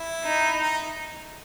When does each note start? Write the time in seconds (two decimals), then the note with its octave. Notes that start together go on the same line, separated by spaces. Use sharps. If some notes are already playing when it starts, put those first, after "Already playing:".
Already playing: E4
0.24 D#4
0.60 D#4